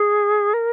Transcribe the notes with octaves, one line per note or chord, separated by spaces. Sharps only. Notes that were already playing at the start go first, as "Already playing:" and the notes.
Already playing: G#4
A#4